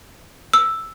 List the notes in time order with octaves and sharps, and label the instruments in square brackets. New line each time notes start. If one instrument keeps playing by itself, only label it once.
[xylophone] E6